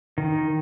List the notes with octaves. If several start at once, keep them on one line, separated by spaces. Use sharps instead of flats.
D#3